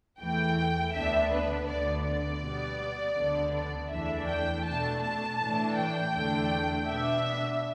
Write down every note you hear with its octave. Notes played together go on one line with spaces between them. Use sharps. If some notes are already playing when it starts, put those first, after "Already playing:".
E2 E3 A3 G5
D2 D3 B3 D4 E5
B4
D2 D3 B3 D5
D5
B2 G3 B3
D2 D3 B3 D4
D5
E2 E3 A3 D4 E5
G5
B2 A3 D4 A5
A5
A2 E3 A3 D4
G5
E2 D3 A3 D4
B2 B3 D4 E5